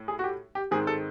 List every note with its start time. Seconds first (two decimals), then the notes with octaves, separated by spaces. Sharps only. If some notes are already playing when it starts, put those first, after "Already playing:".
Already playing: A2
0.08 G#4
0.19 F#4
0.24 G4
0.55 G4
0.71 G#2 D#3 G#3 C4 G#4
0.87 A4